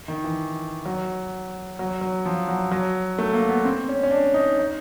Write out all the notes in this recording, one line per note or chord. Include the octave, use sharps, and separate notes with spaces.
D#3
E3
F#3
F#3
F#3
F3
F#3
F#3
A3
A#3
B3
C4
C#4
C#4
D4
D#4
D#4